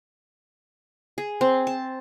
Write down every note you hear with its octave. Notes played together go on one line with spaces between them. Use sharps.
G#4
C4
A5